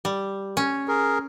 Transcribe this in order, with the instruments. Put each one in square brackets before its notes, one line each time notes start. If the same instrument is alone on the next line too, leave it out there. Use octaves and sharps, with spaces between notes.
[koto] G3
C#4
[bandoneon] G#4 A#4